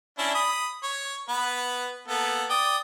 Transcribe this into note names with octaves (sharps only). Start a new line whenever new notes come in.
C#4 D4 E4
B5 D#6
C#5
B3 B4
A#3 B3 A4
D5 G5 D#6